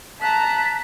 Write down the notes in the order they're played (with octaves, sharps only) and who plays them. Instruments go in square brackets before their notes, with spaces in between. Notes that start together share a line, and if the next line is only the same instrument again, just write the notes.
[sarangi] A5 [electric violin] A#5 F#6 [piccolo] B6